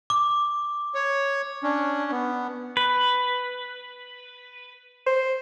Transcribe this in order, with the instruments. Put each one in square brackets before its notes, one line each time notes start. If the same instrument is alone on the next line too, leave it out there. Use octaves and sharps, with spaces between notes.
[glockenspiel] D6
[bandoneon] C#5
C#4 D4
B3
[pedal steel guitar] B4
[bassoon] C5